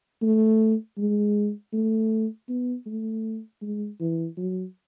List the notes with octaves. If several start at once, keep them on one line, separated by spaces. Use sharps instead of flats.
A3
G#3
A3
B3
A3
G#3
E3
F#3